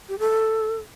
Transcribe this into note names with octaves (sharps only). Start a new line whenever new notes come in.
G4
A4